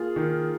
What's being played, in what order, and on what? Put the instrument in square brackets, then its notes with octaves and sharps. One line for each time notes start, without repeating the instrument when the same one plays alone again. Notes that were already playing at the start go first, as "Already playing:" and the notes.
Already playing: [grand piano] A#3 [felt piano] F4 G#4
[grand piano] D#3